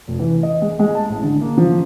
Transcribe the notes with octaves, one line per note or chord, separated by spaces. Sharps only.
F1
E3
D#5
G#3
G#3
A5
A1
D3
A#3
F3